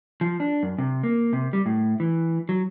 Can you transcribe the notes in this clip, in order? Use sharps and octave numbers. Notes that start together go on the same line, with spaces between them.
F3
D4
F#2
C3
A#3
C3
G3
A2
E3
F#3